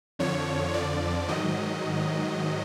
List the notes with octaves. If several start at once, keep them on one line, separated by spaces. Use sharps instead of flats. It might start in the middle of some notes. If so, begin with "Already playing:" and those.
F2 D3 F3 C#5
F2 D3 F3 D5
G#2 D#3 F#3 D#5